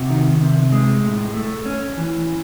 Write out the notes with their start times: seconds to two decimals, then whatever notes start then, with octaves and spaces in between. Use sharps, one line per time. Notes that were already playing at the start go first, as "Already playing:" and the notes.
Already playing: C3 F#4
0.09 D#3
0.40 C3
0.72 G#3
1.03 A2
1.34 A3
1.66 C#4
1.97 E3